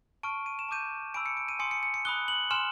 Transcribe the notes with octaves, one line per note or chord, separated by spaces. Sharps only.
A5 C#6 F6 D7
D#7
E7
A5 D6 G6 D#7
G#5 B5 E6 D7
C#7
D7
D#7
G#5 C6 D#6 C#7
C#7
C#7
C#7
B5 D#6 F#6 G7
F#7
G#5 C6 F6 E7